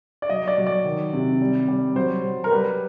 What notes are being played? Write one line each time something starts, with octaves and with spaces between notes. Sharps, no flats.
D5
F#3 D#5
D5
F#3
D5
D#3
C3
G3
G3
F#3 C5
F#3
A#4
G3 B4